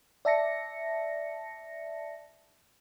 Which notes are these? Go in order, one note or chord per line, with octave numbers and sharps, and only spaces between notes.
D5 E5 A5 A#6 C#7